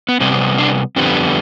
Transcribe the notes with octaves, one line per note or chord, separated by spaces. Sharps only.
B3
C3 G3 B3 C4
D4
F2 D3 G3 B3 C4